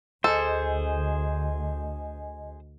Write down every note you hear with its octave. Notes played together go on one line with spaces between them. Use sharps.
D2 G#4 A4 C5 D#5 G#5